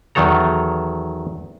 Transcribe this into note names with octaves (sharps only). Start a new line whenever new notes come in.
E2 D#3 F#3 A4 A#5